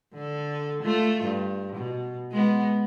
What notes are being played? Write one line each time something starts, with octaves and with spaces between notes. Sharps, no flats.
D3 A4
A3 F4
G2
B2
G#3 B3